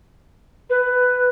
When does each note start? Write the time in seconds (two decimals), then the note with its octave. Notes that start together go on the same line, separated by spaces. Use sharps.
0.70 B4